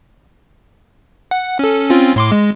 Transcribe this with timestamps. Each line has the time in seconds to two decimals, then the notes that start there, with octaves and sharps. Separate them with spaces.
1.31 F#5
1.59 C#4 A4
1.90 C4 C#4 F4
2.16 A2 C6 D6
2.32 G#3